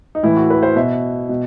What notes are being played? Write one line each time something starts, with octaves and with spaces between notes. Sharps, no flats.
D#4
A2 E3 E4
F#4
B4
C5
B2 E5
B2